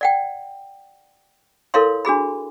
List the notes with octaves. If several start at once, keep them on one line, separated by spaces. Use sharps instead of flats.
D5 F#5 G5
E4 A4 A#4 C#5 F5 C6
D4 F#4 G#4 B5